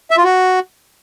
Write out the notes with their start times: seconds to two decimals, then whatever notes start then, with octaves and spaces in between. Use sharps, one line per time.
0.11 E5
0.17 F4
0.24 F#4